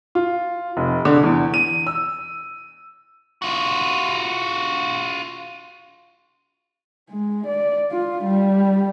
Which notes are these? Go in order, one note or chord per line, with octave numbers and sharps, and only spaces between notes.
F4
F1
D3
E2
D#7
E6
F4 F#4
G#3
D5
F4
G3